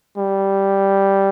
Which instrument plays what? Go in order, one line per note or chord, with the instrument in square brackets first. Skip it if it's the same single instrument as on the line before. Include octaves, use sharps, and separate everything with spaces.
[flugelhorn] G3